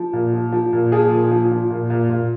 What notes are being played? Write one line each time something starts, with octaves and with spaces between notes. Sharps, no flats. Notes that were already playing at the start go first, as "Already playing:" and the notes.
Already playing: F3
A#2
F3
F3
A#2
F3 G#4
A#2
F3
F3
A#2
A#2
A#2